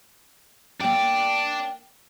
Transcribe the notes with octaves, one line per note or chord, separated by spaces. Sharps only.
A#3 D4 D5 G5